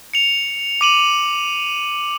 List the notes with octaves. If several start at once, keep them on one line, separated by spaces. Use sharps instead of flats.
C#7 F7
D6 D#7 F#7